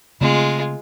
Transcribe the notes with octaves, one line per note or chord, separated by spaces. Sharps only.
C#3 G#3 A3 C4 F4